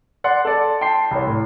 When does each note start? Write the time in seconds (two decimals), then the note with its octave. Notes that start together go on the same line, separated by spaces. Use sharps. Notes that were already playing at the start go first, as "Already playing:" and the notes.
0.24 D5 F#5 C6
0.45 A4 D5
0.81 G5 A5 C6 C7
1.11 C2 C#5
1.27 A2